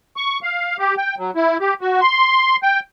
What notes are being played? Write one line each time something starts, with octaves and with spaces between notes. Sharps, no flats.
C#6
F5
G4
G5
F#3
E4
G4
F#4
C6
G5